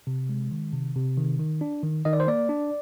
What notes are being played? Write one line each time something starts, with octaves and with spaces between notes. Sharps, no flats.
C3
G#3
D#3
C3
C3
D#3
D#3
D4
D#3
D#3 D#5
D5
C5
A#3 D5
D4